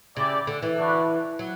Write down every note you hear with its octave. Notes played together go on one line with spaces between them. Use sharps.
C#3 E4 G4 D5
D3
E3
D4 F#4 B4
F#3